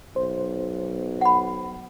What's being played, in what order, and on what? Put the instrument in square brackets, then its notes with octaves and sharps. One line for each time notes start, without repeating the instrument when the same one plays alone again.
[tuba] B1 [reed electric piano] C5
[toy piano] F#5 B5